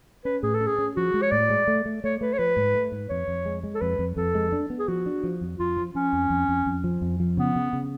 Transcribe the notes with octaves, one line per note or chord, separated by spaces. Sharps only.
C#4 B4
A2 G#4
A4
C#4
G#4
C#4
F3 F#4
G#3
C#5
A2 D5
G#3
A3
A3
A3 C#5
A3 B4
C#5
F3 B4
G#2
A3
G#2
F2 C#5
F2
G#3
G#3
A4
F2 B4
F2
F2 A4
G#3
D4
B3
G#4
F3 F#4
D4
F3
F2
F2 F4
F3
F3 C#4
F2
F2
F2
F2
F3
F2
F3
C#3 B3
C#3
C#3